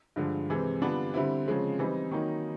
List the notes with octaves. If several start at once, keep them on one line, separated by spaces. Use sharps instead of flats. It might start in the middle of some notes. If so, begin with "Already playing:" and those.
G2 D3 F3 G#3
C3 E3 G#3 C4
D3 G3 B3 D4 F4
D3 G3 C4 E4
C#3 F3 G#3 C4
E3 G3 C4 D#4
D#3 F#3 A#3 D#4